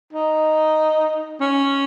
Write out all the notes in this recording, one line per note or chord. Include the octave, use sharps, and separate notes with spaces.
D#4
C#4